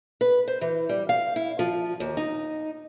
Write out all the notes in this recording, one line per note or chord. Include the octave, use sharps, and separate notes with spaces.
B4
C5
E3
G3
F5
E4
F3
D#2
D#4